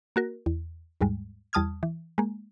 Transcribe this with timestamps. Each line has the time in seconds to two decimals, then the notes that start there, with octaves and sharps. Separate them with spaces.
0.16 A#3 F#4 A#4
0.46 E2
1.01 D#2 G#2 G3 G#3
1.53 E2 G3 A5 D#6 F6 G#6
1.83 E3
2.18 G#3 A#3